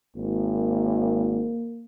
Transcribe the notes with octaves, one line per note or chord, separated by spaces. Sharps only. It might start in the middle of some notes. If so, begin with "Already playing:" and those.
G#1 A#3